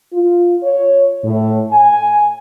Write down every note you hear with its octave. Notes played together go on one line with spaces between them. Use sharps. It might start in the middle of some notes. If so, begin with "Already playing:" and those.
F4
C#5
A2
G#5